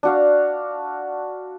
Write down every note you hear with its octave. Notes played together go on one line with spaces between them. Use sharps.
D4 F#4 F5